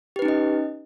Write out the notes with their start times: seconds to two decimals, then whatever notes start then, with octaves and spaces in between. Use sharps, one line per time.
0.16 G4
0.19 B4
0.22 D#4
0.25 C#4
0.28 D#5